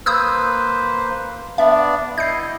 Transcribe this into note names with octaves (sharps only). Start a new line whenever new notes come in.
A#3 B4 C5 D#6 E6 G6
B3 D4 D5 E5
E4 D#5 G6 C7